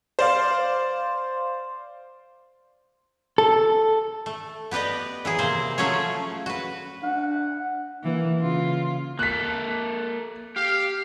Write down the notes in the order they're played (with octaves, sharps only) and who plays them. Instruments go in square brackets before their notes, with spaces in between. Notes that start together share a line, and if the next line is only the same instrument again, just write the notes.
[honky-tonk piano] C5 D5 F5
[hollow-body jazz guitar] A4
[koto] A3
B3 G4 B4 D5 D#5
E3 F#3 G#4
C3 A#3 C4 C5
F3 F#3 A3 C#4 G#4 C#5
F#4 B4
[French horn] D4 [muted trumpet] F#5
[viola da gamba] E3 A#3
C#3 F4
[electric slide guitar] A#3 A4 [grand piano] F#6 B6
[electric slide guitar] G4 [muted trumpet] F5